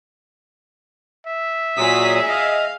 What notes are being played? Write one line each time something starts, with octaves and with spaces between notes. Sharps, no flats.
E5
A#2 F#3 G#3 G#4 D#6 B6
D#5 F5